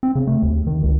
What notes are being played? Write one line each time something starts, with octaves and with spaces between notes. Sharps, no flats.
C4
C#3
A3
D#2
D#3
C#2